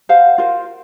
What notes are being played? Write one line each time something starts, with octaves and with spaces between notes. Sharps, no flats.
C5 F5 F#5
F4 A#4 C5